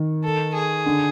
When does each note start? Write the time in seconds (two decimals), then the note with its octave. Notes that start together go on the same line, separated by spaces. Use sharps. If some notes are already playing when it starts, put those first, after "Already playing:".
Already playing: D#3
0.24 A4
0.54 G#4
0.86 D3